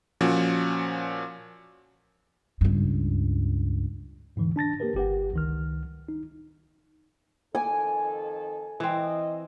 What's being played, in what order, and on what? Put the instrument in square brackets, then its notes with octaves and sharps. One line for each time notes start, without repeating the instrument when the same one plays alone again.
[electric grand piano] A#2 F3 C#4 F#4
[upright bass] C#2 G2
[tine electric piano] E2 G#2 D3 E3
D4 A5 A6 A#6
A#3 G4 A#4 B4
G1 G4 B4 F#5
C#2 D#3 F6
D#4
[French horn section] F2 D#3 A4 [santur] G#5 D6
[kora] E3 C4 [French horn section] D#5